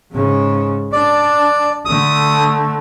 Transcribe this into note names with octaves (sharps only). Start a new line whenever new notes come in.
G#2 C#3
D4 D5
D3 A3 D#6